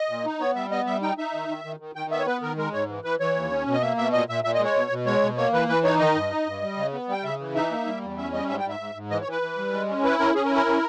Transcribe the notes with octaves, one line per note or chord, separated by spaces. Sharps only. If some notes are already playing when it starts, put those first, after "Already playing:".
Already playing: D#5
A#2
D#4
B3 C#5
G3 E5
B3 D#5
G3 E5
D#4 G5
D#4 E5
D#3
D#3
D#3
D#3
D#3 G5
B3 E5
C#5
B3 B4
D#3 A#4
G#3 A#4
G#2 C#5
E3
E3 B4
E3 C#5
D#2
C#4
B2
D#5
A#3 E5
B2 E5
A#2 D#5
A#2 E5
A#2 E5
D#5
G#3
C#5
B2
B2
G#3 C#5
B2
A#3 C#5
E3 B4
E3 B4
D#4 C#5
D#3 D#5
G2
D#4
G2
G3
C#3
B3
G3 G5
C#3 E5
E3
D#4 E5
A#3
G3
E2
C#4 E5
G3 D#5
G#2 E5
G5
G#2
E5
G#2
G#2
E3 D#5
C#5
E3
B4
E3
G3
G#3
C#4
E4 B4
C#4 A#4
C#4 G#4
A#4
E4
A#4
C#4